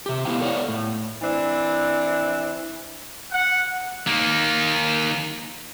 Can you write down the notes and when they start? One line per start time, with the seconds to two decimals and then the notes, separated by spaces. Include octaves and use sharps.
0.06 C3 G4
0.25 A3 B3 E4 C5 F5 G5
0.40 A4 A#4 C#5 D5 F5 F#5
0.69 A2
1.22 E3 C4 D4 E4
3.32 F#5
4.07 D#3 A#3